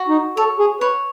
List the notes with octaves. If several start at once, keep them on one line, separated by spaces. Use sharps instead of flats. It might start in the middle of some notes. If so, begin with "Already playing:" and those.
Already playing: F#4
D#4
A4 C#5
G#4
B4 C#5